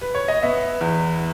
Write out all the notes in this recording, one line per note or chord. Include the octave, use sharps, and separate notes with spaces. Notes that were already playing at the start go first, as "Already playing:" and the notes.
B4
C#5
D#5
B3 E5
E2